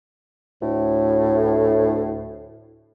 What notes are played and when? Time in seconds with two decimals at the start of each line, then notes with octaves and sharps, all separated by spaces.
0.61 D2 A2